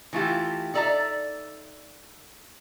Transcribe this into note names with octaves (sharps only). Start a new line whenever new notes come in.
E3 A3 E4 F4 G4
D#4 A4 D5 E5 A#5